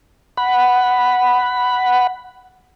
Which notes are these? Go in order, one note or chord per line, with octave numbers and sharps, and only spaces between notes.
F#5 B5